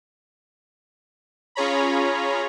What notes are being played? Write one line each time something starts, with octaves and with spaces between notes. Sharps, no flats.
C#4 F4 G#4 C#5 A#5 B5